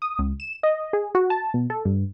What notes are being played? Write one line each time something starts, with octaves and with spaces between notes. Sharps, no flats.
D#6
C#2
E7
D#5
G#4
F#4
A5
B2
A4
G2